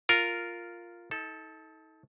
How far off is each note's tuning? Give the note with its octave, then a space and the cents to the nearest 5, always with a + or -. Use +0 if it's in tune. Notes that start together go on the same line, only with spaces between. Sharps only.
F4 +0 A#4 -5
D#4 +40 A4 -10